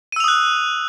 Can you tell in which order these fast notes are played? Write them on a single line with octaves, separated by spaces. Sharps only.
D#7 E6 F7 D#6 F#6